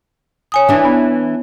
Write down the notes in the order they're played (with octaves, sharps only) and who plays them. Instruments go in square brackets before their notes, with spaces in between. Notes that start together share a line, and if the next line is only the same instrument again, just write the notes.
[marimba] C#5 G#5 D#6
[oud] E3 D4
[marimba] B3